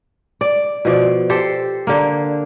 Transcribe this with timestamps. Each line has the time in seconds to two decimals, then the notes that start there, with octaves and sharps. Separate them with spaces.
0.41 D5
0.85 B2 F3 D5
1.30 G4 A4 C5
1.87 D3 A#3